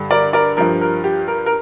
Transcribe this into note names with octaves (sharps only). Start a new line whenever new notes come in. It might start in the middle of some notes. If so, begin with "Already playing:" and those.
Already playing: G2 D3 G3
A#4 D5
A#4 D5
G2 F3 A#4
A#4
G4
A#4
A#4